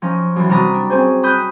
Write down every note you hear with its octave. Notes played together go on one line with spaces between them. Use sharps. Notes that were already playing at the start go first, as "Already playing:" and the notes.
F3 C#4 D#4
F#2 E3
C3 G3 F#4 A#5 B5 D#6
D4
C4 C#4 G#4 C5
B5 D#6 F#6 G6